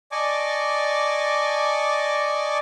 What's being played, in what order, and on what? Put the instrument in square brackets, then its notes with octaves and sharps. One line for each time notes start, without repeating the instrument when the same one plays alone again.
[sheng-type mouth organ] D5 D#5 G#5 A5 C#6 D6